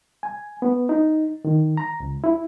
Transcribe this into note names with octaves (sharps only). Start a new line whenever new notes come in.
G#5
B3
D#4
D#3
A#5
C#2
E4